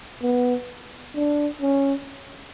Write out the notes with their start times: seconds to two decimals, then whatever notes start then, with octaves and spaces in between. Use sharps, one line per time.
0.22 B3
1.15 D4
1.62 C#4